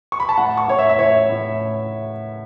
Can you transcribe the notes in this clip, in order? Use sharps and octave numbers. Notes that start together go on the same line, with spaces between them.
C#6
B5
A5
A2 F#5
C#6
A2 C#5
E5
E5
A2 C#5
A2